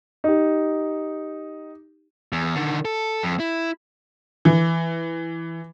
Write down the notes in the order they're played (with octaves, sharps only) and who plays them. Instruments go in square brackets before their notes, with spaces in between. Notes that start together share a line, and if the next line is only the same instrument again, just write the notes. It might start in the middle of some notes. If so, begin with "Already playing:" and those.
[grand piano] D#4 G4
[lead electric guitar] E2
D3 D#3
A4
F2
E4
[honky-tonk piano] E3